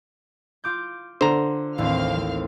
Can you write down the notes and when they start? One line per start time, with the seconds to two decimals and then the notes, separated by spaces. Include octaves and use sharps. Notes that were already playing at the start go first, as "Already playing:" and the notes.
0.64 F4 D6 G6
1.21 D3 C5 A#5
1.78 A1 D#2 C4 F5 F6